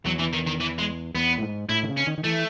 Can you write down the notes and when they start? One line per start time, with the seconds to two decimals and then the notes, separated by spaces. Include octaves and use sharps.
0.05 E2 F#3
0.19 E3
0.33 D#3
0.47 D#3
0.60 E3
0.79 G#3
1.14 E2 B3
1.38 A2
1.42 G#2
1.69 A2 E4
1.83 D#3
1.89 C#3
1.97 C#4
2.07 D#3
2.18 D#3
2.24 E3 A3